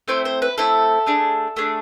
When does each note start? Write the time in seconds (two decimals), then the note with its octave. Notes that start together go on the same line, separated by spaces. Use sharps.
0.08 A3 C4 E4 C5
0.25 C5
0.42 B4
0.58 A3 C4 E4 A4
1.06 A3 D4 G#4
1.57 A3 D4 G#4